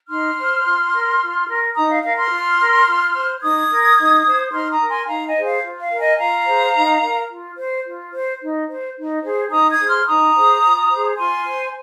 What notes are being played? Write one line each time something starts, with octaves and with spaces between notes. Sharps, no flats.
D#4 C6 F6
C5
F4
A#4
F4
A#4
D#4 A#5 D#6
F5
A#4 F5
C6 F6
F4
A#4
F4
C5
D#4 D#6 G#6
A#4
D#4
C5
D#4 C6 F6
A#5 D#6
A#4
G#5 C6
D#4 F5 A#5
D#5 G#5
G#4 C5
F5
F4
F5
A#4
D#5 G#5
F4 F5 A#5
G#4 C5
D#4
A#4
F4
C5
F4
C5
D#4
C5
D#4
G#4 C5
D#4 A#5 D#6
D#6 G#6
G#4 C5
C6 F6
D#4 A#5 D#6
G#4 C5
F4
G#4 C5
F4 G#5 C6
C5